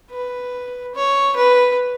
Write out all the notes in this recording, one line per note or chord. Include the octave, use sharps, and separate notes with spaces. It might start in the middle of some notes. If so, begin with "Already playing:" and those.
B4
C#5
B4